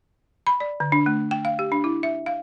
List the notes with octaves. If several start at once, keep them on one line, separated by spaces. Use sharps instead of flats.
B5
D5
D3
D4
A3
G5
F5
G4
D4
E4
E5
F5